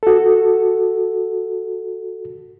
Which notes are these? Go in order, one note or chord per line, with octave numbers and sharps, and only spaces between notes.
F#4 A4